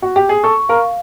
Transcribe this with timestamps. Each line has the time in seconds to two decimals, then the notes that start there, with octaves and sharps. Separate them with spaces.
0.02 F#4
0.16 G4
0.29 G#4
0.43 A4 C#6
0.69 A#4 F5